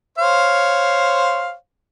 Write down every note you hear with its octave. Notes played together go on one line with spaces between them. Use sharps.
C5 C#5 F5